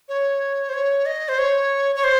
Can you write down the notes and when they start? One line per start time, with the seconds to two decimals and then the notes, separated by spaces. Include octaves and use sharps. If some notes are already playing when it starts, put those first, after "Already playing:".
0.09 C#5
0.69 C5
0.74 C#5
1.06 D#5
1.29 C5
1.39 C#5
1.96 C#5
2.04 C5